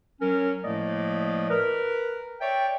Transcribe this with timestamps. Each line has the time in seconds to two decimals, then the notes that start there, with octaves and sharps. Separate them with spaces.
0.21 F#3 C#4 A#4
0.64 A2 F3 A3 A#3 D5 D#5
1.50 A#4 B4
2.41 C#5 D5 E5 G5